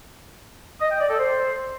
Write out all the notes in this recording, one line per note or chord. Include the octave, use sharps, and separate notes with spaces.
D#5
G5
D5
A4
C5